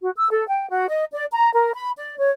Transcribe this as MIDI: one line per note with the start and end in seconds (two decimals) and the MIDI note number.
0.01 0.10 66
0.16 0.27 88
0.30 0.46 69
0.48 0.68 79
0.70 0.86 66
0.88 1.04 75
1.12 1.25 74
1.32 1.49 82
1.54 1.74 70
1.74 1.91 83
1.97 2.16 74
2.19 2.30 73